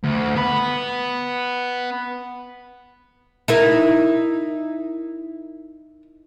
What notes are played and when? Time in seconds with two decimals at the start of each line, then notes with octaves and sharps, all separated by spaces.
0.04 D2
0.36 B3 B5
3.48 D#4 E4 A#4